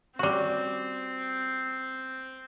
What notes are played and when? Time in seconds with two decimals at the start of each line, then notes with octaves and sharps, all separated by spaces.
0.19 G3 C4 F#4